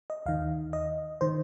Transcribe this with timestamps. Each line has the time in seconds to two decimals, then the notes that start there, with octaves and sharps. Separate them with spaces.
0.10 D#5
0.26 D#2 D#3 F5
0.73 D#5
1.21 D#3 C5